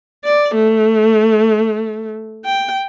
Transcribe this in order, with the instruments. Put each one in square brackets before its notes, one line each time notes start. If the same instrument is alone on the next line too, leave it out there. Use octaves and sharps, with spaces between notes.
[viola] D5
A3
G5